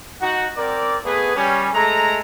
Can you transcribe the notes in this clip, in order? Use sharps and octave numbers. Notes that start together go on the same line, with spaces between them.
D#4 F#4 F#5
C4 A#4 D5
A3 B3 G#4 B4
G3 C#4
G#3 A3 A#5